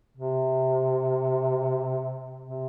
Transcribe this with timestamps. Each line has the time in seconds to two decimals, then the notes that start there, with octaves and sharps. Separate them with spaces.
0.17 C3
2.42 C3